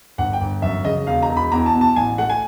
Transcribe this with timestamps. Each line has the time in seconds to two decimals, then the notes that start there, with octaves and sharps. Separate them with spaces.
0.18 G1 F#5
0.33 G5
0.41 G1
0.62 F#2 E5
0.85 C#3 D#5
1.07 E1 F5
1.22 A#5
1.29 E1
1.37 B5
1.52 E2 A#5
1.66 A5
1.74 B2
1.81 A5
1.96 A1 G#5
2.18 A3 F#5
2.30 G#5